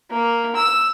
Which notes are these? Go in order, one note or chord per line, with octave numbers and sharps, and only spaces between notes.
A#3
E6